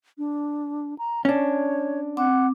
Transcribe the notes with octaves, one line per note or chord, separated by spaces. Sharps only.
D4
A#5
C#4 D4 C#5
C4 F#5 D6